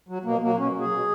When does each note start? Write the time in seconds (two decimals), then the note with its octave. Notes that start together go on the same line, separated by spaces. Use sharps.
0.08 F#3
0.25 B2 A#3
0.41 F#3 A#3
0.58 B2 C#4
0.74 F#3
0.80 G#4
0.91 B2